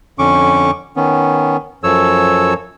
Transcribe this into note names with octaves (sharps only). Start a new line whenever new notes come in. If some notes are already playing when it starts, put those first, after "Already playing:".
F2 D3 C#4 C#6 D6
D#3 B3 C#4
F#2 F3 A4 C#5 E6